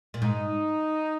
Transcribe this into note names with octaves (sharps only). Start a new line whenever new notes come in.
A#2
G#2 D#4